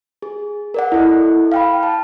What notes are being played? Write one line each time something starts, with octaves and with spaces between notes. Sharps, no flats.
G#4
A#4 D5 F#5
E4 A4 D#5
F5 G5 B5
A5